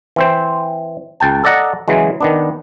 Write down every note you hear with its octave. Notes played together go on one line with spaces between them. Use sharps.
E3 C4 C5
C#2 G5 A5
A4 D5 D#5 F#5 A#5
C#3 E3 F#3 G#3
D#3 B3 D4